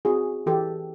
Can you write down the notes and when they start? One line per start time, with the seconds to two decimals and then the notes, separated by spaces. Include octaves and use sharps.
0.05 C4 F#4 G#4
0.46 E3 G4 A4